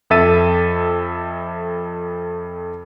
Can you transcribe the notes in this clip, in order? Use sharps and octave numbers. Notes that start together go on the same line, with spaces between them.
F2 A4 E5 A6 D#7